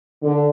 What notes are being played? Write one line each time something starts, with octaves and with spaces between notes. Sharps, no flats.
D3